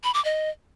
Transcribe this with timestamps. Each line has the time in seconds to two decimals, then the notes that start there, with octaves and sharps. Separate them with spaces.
0.04 B5
0.14 D6
0.25 D#5